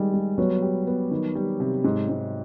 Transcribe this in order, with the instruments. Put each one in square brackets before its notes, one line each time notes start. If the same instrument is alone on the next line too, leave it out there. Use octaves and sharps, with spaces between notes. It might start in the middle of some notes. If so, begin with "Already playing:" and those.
Already playing: [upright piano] D#3 G#3 [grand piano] G3
[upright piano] G#3
[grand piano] F#3 [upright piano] B3
[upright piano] G4
B3
D#3
G3
C3
G#2
G#2